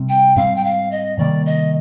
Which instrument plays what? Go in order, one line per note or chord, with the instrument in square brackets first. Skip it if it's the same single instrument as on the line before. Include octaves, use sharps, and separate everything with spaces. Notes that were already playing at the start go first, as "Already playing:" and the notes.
Already playing: [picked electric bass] C3 G3 C4
[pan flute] G5
[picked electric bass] G#2 G3 C4 [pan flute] F5
[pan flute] G5
F5
D#5
[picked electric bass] C3 D#3 G3 A#3 [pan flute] D5
[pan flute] D#5